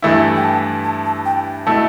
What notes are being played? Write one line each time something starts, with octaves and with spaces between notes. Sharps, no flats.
G2 E3 A3 E4
G5
A5
A5
A5
G5
B2 A3 E4 A5